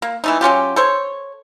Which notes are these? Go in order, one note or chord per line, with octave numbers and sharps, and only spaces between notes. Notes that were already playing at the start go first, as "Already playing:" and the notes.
A#3
E3 A3 D#4
F#3 C#4 F4 G4
A4 C5 C#5